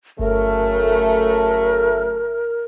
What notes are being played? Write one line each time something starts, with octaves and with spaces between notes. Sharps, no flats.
G1 C#3 F#3 A3 A#4